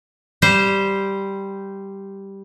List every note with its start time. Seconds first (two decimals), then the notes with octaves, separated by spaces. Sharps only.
0.42 G3 G4 C5